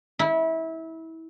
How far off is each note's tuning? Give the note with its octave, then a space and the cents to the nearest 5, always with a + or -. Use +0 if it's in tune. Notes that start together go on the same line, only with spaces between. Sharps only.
E4 -25